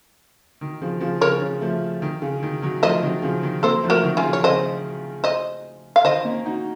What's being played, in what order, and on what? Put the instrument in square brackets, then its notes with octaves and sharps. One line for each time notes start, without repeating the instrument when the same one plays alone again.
[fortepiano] D#3
C#3 F3
C#3 F3
[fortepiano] C#3 [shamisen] A#4 C#5
[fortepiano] C#3
F3 A3
D#3
C#3
D#3
D#3 F#3
[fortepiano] F3 A3 [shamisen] C5 D#5
[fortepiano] D#3 F#3
C#3 F3
D#3
[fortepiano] F#3 A#3 [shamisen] A4 C5
[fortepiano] F3 A3
[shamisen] F#4 A#4
[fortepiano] D#3 F#3
[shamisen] C#4 F4
[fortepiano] C#3 F3
[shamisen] C#5
[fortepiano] C#3 [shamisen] C5 D#5
[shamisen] C5 D#5
F5
[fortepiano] D#3 [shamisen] C5 D#5
[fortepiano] A#3 C#4
D#4 F#4